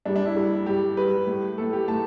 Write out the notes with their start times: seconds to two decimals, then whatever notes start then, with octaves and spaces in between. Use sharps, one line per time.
0.06 G2 G3 D4
0.16 D4
0.26 E4
0.36 G2 G3
0.66 G2 G3 G4
0.97 G2 G3 B4
1.27 A2 A3
1.57 A2 A3 A4
1.73 G4
1.88 A2 A3 A5